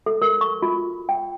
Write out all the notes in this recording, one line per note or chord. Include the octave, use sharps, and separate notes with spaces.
A4
A#4
C#6
F4
G5